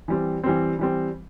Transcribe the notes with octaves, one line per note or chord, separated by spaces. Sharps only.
E3 G3 C4
E3 G3 C4
E3 G3 C4